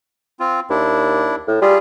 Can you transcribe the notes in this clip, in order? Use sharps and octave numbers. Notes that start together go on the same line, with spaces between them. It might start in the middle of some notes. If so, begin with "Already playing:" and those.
C4 F4
D#2 D4 E4
A2
G3 F4 G#4